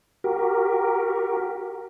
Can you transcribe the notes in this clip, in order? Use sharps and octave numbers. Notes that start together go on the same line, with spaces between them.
F#4 G4 A#4